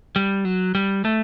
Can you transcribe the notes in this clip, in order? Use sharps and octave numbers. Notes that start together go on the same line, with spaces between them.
G3
F#3
G3
A3